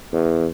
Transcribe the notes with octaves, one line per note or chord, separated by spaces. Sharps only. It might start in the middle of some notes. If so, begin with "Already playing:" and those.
E2